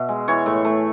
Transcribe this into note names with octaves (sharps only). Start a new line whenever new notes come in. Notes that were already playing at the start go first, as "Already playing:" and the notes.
Already playing: B2 E5
G#3
E3 C#5
A2
A3